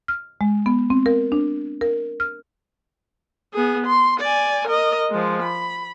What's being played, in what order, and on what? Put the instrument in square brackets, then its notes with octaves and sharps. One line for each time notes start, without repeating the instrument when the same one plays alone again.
[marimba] F6
G#3
B3
C4
A#4
D4
A#4
F6
[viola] B3 G#4
C6
D5 G#5
A#4 D#5
F3 G#3
B5